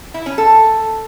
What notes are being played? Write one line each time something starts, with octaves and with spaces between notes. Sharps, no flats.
E4
C#4
A4